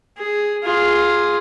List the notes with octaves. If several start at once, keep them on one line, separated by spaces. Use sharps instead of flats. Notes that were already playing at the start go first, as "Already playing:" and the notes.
G#4
F4 G#4